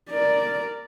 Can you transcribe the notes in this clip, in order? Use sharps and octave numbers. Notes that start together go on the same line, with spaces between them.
A#4 D5